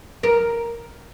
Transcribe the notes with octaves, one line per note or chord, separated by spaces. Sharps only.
A#4